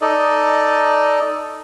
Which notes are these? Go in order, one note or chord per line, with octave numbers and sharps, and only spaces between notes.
D#4 A4 D5 D#5